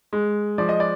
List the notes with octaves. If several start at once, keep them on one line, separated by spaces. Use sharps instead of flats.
G#3
F3 D5
D#5
D5